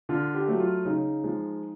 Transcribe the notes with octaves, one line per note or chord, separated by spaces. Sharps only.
D3 F4
G4
F#3 A3
F4
C#3 D#4
F3 G#3